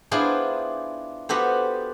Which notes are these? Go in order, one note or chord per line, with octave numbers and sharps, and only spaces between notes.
B3 D4 E4 F4 G#4 C5
B3 F#4 G4 A4 C5